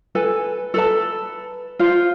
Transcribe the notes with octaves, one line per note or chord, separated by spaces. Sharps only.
A4 B4 G#5
A4 B4 A5
F4 C5